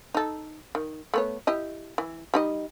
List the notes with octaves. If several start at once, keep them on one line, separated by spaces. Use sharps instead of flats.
D#4 A4
D#3
A3 B3 C#5
E4 G4 D#5
E3
G3 D#4 D#5